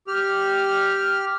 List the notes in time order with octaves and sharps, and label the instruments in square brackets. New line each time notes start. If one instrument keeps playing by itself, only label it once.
[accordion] G4 F6